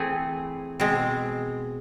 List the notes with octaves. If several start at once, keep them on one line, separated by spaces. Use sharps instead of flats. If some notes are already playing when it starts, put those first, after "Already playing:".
Already playing: E3 A3 C4 G#4
B2 G#3 C4